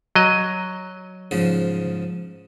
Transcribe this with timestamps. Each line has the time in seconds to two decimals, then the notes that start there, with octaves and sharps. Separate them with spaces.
0.16 F#3 D#5
1.31 G#2 C#3 F3